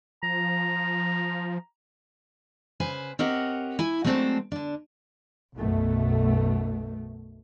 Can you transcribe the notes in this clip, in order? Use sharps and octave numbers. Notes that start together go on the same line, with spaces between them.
F3 A#5
C#3 B4 C5 G#5
C4 G4 A#4 C#5 D#5 F#5
E4 G#5
F#3 G#3 A3 C4 D4 C5
D3 D4
B1 F#2 B2 A3